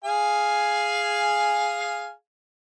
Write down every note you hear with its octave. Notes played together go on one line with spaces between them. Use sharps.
G#4 F5 G#5